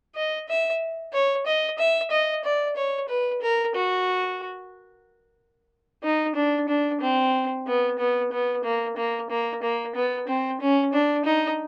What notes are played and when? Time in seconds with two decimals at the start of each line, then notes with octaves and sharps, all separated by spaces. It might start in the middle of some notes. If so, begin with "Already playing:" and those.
0.16 D#5
0.49 E5
1.13 C#5
1.46 D#5
1.79 E5
2.11 D#5
2.44 D5
2.76 C#5
3.09 B4
3.42 A#4
3.75 F#4
6.03 D#4
6.36 D4
6.68 D4
7.01 C4
7.67 B3
7.99 B3
8.32 B3
8.64 A#3
8.97 A#3
9.30 A#3
9.62 A#3
9.95 B3
10.28 C4
10.61 C#4
10.93 D4
11.25 D#4